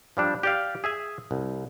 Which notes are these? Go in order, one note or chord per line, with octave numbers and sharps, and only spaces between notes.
F3 G3 D4
G4 D5 F5
G#4 E5 G#5
C2